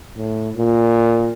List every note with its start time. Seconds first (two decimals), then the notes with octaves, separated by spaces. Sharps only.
0.17 A2
0.56 A#2